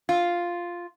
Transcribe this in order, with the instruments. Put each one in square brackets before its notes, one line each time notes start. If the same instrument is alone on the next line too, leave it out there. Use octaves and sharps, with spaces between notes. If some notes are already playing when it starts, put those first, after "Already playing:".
[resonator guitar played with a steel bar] F4